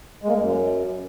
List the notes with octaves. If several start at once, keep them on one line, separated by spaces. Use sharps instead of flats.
G#3
A#3
G#3
F#2